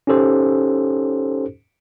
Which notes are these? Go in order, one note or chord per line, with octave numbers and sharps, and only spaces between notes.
C#4 D#4 G4 A4 C5